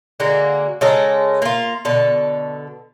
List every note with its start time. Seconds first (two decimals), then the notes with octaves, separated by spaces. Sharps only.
0.20 D3 G#3 A#3 F#4
0.81 C#3 G#3 A4 A#4
1.42 A#3 F4
1.85 B2 D3 A4